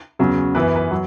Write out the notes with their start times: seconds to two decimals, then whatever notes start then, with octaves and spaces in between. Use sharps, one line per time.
0.19 E2 C#3 F#3
0.55 F#2 E3 B3 B4
0.75 B4
0.91 F#3